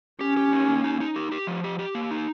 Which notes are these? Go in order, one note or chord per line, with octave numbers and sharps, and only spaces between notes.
C#4 G4
G4
D#4
A#3
D#4
D#4
G4
G4
F3
G4
G4
A#3
D#4